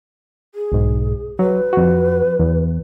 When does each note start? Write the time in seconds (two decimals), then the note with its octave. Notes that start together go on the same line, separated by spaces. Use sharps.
0.55 G#4
0.72 B1 G#2
1.39 F#3 B4
1.73 F2 F#4
2.39 E2